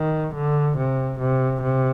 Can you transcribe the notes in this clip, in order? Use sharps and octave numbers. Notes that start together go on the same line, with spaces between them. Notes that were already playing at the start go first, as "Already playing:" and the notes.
Already playing: D#3
D3
C3
C3
C3